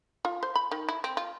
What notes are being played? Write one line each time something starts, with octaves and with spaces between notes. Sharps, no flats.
F4
C5
B5
D#3
E4
C4
F4